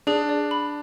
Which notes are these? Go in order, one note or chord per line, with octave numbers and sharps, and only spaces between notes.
D4 G#4
D5
B5